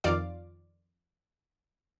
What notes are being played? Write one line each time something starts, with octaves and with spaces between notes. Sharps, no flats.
F2 D#3 F4 D5 F5 D6